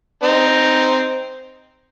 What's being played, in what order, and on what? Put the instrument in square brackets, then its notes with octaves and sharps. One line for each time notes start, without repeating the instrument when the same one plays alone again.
[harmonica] C4 D#4